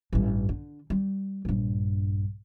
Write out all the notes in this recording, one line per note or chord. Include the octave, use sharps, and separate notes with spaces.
A1 G2
D3
G3
A#1 G2